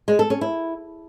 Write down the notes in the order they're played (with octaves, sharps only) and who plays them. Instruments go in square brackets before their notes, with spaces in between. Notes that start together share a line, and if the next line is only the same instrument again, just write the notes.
[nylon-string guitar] G#3
A4
C#4
E4